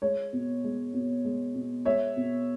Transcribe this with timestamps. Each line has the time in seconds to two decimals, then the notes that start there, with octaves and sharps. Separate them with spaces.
0.02 G#3 C#5
0.33 B2
0.64 G#3
0.94 B2
1.25 G#3
1.55 B2
1.85 G#3 C#5 E5
2.17 B2